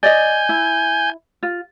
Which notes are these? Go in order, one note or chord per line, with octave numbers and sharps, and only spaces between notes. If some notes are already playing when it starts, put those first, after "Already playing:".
D5 D#5 G#5 G6
E4
F4